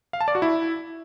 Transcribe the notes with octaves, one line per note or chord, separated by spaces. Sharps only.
F5
A5
D5
F#4
E4